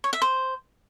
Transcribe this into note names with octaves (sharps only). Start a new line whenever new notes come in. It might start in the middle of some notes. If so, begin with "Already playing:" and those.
C#5
E5
C5